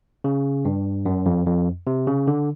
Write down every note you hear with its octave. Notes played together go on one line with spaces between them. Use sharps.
C#3
G2
F#2
F2
F2
C3
C#3
D3